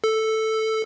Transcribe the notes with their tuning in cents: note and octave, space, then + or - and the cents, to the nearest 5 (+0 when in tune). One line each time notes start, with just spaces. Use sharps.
A4 +0